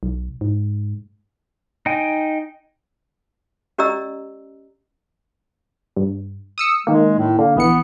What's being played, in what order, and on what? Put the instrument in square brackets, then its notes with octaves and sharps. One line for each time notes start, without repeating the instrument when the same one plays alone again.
[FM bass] B1
G#2
[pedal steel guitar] D#4 G5 G#5
[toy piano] C#4 G4 D5 D#5 A#5 E6
[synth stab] G2
D#6 E6 C#7
[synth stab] D#3 A#3 [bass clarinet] G#3
[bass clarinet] A2
[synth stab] D3 [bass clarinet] A#3
[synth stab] A#1 E3 C#7 [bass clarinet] B3